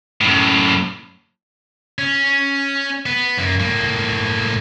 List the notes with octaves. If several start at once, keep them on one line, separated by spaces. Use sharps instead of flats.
F#2 A2
C#4
B3
F#2 A#3
A2 A#3